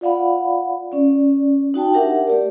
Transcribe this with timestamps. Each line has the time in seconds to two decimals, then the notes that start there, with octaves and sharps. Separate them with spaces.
0.01 F4 D5 F5 F#5 B5
0.92 C#4 D5
1.74 D#4 F#4 G5 A5
1.94 D4 G4 A#4 E5 F#5
2.28 A3 G4 D5